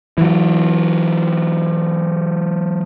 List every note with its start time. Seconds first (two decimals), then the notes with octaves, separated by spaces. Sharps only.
0.18 E3 F#3